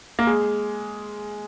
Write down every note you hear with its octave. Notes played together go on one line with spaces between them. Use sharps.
A#3
G#3